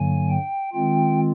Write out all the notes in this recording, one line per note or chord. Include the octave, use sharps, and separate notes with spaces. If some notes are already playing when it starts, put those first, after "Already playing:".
Already playing: G2 D3 F#3 A#3 G#5
G5
D#3 G#3 C4 F4 G5